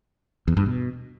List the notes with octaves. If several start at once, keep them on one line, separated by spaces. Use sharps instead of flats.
E2
G2
B2